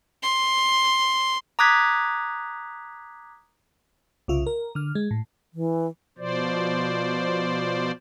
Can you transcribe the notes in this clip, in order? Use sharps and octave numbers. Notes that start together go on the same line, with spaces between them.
C6
A#5 D6 D#6 F#6 G#6 B6
C2 C#3 F4 E5
A#4
D3 F6
G#3
A2
E3
B2 F3 C5 D5